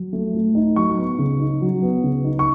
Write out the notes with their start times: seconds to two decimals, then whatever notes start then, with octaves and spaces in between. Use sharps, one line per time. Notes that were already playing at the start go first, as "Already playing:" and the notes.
Already playing: F#3
0.13 A3
0.34 A2
0.55 D#4
0.76 F#3 C#6
0.98 B3
1.19 C#3
1.40 D#4
1.61 F#3
1.82 B3
2.04 C#3
2.25 D#4
2.39 C#6